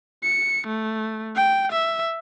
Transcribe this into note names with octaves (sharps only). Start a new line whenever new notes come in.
C#7
A3
G5
E5